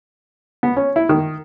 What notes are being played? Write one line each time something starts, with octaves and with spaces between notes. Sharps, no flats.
B3
C#4
E4
D#3